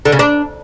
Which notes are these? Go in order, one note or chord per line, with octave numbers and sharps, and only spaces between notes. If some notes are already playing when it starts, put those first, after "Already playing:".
D3
C#3
D4